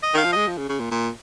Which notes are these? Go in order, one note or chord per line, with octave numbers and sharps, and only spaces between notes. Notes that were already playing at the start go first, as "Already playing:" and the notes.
D#5
D#3 F5
F3
G#3 D#5
F3
C#3
C#3
A#2
A#2